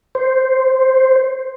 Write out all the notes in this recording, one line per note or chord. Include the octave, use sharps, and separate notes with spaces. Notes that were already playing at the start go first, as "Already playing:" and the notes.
C5